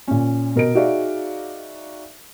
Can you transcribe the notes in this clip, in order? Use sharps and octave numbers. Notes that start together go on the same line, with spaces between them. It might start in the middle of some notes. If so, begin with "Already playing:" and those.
A#2 C#4
B2 A#4 D#5 D7
D#4 F#4 G#4 D5 E5 F5